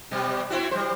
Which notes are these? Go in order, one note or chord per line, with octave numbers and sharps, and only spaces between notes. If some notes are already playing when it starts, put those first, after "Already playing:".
B2 G3
C4 E4 F#4
G3 C5